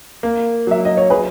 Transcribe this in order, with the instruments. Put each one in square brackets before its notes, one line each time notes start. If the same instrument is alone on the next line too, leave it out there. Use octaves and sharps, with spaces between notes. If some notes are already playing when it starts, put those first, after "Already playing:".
[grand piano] A#3
[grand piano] F#3 [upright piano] E5
[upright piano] D#5
C#5
[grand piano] F#3 [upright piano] G#4 B4